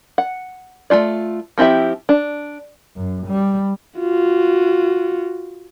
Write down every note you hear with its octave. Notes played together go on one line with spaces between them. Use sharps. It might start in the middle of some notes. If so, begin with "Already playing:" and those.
F#5
A3 D#4 F4 D5
F3 C4 E4 G4 E5
D4
F#2
G3
F4 F#4